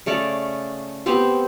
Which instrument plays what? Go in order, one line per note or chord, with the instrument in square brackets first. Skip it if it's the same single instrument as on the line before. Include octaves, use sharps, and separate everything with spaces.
[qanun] C#3 A3 C#5 D5
B3 C4 G4 C5